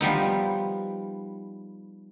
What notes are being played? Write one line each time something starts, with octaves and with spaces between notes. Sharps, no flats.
F3 G3 B3 D#4